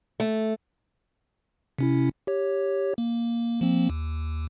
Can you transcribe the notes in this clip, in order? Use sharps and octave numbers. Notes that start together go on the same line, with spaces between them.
A3
C3 C#4 E4
G4 C#5
A#3
F3 A#3 C4
D#2